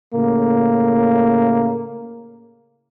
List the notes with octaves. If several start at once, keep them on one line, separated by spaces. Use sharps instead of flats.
A2 C#3 A#3